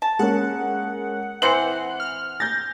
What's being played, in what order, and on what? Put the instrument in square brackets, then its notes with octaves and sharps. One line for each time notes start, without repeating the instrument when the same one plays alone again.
[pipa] A5
[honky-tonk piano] G#3 A#3 C#4 [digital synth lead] F#5
[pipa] E3 C4 C5 [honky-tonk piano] C#7 F#7
[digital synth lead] F6
[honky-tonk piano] G6 A#6 [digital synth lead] A6